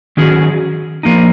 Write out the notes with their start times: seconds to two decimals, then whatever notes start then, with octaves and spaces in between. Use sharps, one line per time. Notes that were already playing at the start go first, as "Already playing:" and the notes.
0.17 D#3 F#3 C#4 G#4
1.03 F3 A#3 D#4